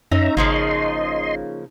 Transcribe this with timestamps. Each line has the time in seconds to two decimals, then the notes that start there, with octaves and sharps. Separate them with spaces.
0.12 F#2 C#4 D#4 E5 A#5
0.37 G#1 C#3 F3 A#3 D#5 C6